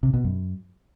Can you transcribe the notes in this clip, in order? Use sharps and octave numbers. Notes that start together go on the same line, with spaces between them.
C3
B2
F#2